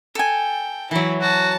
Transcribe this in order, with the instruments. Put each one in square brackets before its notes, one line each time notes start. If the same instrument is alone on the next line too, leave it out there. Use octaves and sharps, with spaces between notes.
[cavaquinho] A4 G#5 [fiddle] G5
[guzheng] E3 F#3 [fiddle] E4
[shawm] F#4 [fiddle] A5